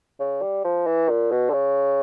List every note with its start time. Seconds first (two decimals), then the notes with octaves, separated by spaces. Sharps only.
0.20 C#3
0.42 G3
0.64 F3
0.86 E3
1.09 A#2
1.31 B2
1.50 D3
1.53 C#3